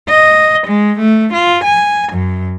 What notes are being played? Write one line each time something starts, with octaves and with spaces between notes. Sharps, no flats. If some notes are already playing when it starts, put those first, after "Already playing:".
D#5
G#3
A3
F4
G#5
F#2